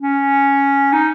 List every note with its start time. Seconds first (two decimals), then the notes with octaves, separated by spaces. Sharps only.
0.01 C#4
0.93 D#4